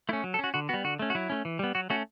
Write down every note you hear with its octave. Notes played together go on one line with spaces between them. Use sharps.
A3 C#4 E4
F#3
A4
C#4 F#4
D3 F#4
G3 B3 F#4
D3 F#4
A3 C#4
F#4
F#3 E4
A3 C#4
E3
G3 B3
F#3 F#4
A3 C#4 F#4